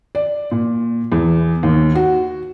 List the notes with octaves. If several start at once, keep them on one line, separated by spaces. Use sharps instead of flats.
D5
A#2
E2
D#2
F#4